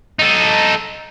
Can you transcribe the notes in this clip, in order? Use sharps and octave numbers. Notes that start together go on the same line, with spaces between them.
D#4 A4